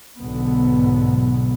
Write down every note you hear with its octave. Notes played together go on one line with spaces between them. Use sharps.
B1 G#2 B2 D3 B3